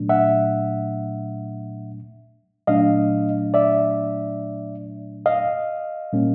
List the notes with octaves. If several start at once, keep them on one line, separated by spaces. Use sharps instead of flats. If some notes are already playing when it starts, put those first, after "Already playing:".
Already playing: A#2 F#3 A3 D4
E5 F#5
A#2 F#3 A3 D4 D#5 F5
D5 E5
D#5 F5
A#2 G3 A#3 C#4